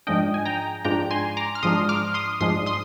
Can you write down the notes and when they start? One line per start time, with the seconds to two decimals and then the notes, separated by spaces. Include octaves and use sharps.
0.07 G#2 F3 G#3 D4 D#5 G5
0.34 G#5
0.46 G5 A#5
0.85 G#2 F3 G#3 D4 G5 A#5
1.11 G#5 C6
1.37 A#5 D6
1.55 F6
1.63 G#2 F3 G#3 D4 C6 D#6
1.89 D6 F6
2.14 C6 D#6
2.41 G#2 F3 G#3 D4 C6 D#6
2.66 C6 D#6